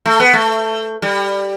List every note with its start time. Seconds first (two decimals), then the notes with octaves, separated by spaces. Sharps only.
0.06 A3
0.20 B3
0.33 A3
1.02 G3